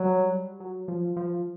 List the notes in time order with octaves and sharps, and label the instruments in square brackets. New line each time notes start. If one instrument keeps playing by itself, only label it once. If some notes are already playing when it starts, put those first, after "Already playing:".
Already playing: [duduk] F#3 [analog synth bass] G3
[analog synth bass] F#3
F3
F3